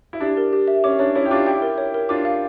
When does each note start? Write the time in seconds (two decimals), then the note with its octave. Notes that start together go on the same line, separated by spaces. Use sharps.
0.13 E4
0.20 D4 G4
0.37 A#4
0.53 G4
0.68 E5
0.84 C#4 D6
0.99 D4 C#5
1.15 C#4 E4 C#5
1.25 G4
1.31 D4 F4 D6
1.46 E4 G4 G5
1.62 A#4
1.78 C#5
1.94 A#4
2.09 D4 F4 D6
2.25 F5